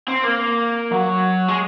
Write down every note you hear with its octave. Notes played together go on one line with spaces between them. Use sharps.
C4
A#3
F#3
G#3